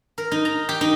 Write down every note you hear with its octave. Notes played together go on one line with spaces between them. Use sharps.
A#4
D#4
A#5
G4
D#4